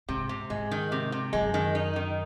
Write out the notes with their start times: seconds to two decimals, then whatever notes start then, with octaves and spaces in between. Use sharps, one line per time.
0.09 G#2 C3
0.29 C3
0.50 G#2 G#3
0.71 D#3
0.92 C3
1.12 C3
1.33 F#2 G#3
1.54 D#3
1.75 D#4
1.96 D#3